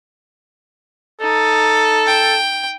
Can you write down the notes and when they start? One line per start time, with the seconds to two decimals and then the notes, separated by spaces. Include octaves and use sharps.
1.21 D#4 A4
2.07 G5